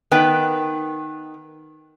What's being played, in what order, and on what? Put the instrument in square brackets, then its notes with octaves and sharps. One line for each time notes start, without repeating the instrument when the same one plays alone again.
[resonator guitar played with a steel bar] D#3 B3 B4 G5